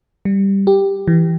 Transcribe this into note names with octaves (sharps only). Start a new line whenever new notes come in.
G3
G4
E3